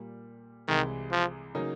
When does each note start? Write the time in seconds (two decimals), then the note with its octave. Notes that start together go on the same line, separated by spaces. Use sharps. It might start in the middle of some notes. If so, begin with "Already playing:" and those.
Already playing: A#2 G3 A#3
0.68 C2 C3 D#3 E3 G#3
1.11 F3
1.55 C#3 F#3 A#3 D#4